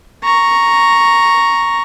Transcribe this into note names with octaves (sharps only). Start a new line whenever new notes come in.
A#5 C#6